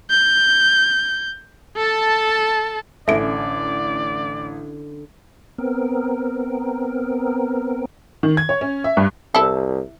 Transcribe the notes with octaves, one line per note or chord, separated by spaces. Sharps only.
G6
A4 A5
A1 D3 C#4 A4 D5 E5 D7
B3 C4 A#4
D#3
G#6
C#5
C#4
E5
G2
C2 E4 A4